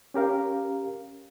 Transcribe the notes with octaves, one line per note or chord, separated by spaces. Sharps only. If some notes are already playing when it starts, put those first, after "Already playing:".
C#4 G4 A#4 F5